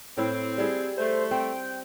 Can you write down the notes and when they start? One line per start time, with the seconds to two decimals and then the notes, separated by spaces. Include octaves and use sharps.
0.18 A2 C4 E4
0.58 G3 E4 G#4
0.97 A3 C5
1.31 C4 G5